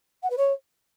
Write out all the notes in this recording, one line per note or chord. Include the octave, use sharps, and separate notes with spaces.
F#5
B4
C#5